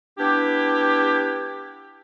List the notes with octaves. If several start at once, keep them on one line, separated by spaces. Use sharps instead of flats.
B3 D4 E4 G4